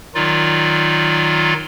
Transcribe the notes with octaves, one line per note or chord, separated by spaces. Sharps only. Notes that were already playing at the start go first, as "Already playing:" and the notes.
D#3 F#3 D#4 F4 D5